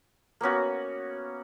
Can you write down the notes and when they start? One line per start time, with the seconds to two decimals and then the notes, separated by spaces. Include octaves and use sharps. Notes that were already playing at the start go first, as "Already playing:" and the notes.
0.41 A#3 B3 C#4 F#4